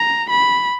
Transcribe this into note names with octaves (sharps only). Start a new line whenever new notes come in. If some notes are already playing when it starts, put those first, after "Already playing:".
Already playing: A#5
B5